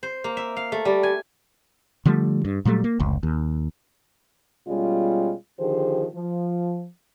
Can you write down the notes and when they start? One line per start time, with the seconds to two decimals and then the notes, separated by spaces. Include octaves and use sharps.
0.03 C5
0.24 A#3
0.37 E5
0.56 F5
0.72 A3
0.85 G3
1.03 G#5
2.06 D3 F3 G3 A3
2.45 G2
2.65 A#2 F#3 G3 A3
2.84 A#3
3.00 F1 C#2
3.23 D#2
4.67 B2 G3 G#3 C#4 F4
5.59 D3 D#3 F3 G4 G#4 C5
6.14 F3